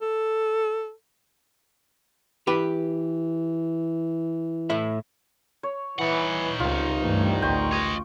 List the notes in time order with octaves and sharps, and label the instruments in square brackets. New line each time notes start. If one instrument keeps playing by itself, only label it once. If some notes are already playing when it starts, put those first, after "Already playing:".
[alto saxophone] A4
[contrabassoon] E3 [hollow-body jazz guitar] G4 B4
[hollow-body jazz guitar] A2 E4 E5
[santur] C#5
[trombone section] E3 [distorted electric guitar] D#4 F#5
[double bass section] C#2 [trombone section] C3 D#3 G3 [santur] F4
[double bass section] G2 E3 A3
[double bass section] A1 D2 [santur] G5 C6 C#6
[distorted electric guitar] C#5 D#5